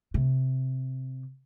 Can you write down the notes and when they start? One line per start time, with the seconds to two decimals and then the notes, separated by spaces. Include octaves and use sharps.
0.14 C3